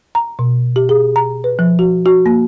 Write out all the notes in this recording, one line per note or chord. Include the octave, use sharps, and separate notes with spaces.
A#5
B2
G4
G#4
A#5
B4
F3
F#4
F#4
A#3